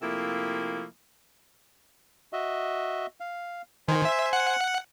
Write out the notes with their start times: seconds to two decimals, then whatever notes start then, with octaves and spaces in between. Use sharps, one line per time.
0.02 C3 F3 A3 A#3 E4
2.33 F#4 D#5 E5
3.20 F5
3.88 D#3 C5 G#5 C6
4.05 E5
4.33 F#5